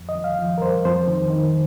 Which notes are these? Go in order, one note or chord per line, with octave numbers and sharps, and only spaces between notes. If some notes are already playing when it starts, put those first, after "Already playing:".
Already playing: F2
D#5
F2
F5
F3
A#4
F2 C5
F2 C5
D#3
D#3